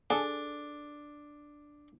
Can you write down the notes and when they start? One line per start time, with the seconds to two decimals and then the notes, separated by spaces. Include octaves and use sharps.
0.10 D4 G#4 A4 G#5